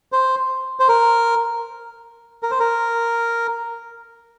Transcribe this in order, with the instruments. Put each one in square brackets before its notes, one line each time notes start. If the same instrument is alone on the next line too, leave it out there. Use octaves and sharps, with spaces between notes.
[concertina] C5
C5
A#4
A#4
C5
A#4